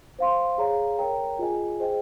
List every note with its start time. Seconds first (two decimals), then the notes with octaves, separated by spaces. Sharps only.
0.19 C5 F5 C6
0.58 G#4 C#5 F5 A#5
0.99 A#4 C#5 G5 A#5
1.39 F4 G#4 D#5 G#5
1.80 G#4 C5 D#5 G5